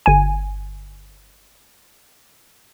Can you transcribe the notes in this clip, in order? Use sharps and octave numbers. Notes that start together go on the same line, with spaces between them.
G1 G#5